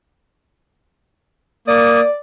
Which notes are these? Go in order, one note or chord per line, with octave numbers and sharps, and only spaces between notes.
A#3 D5 D#6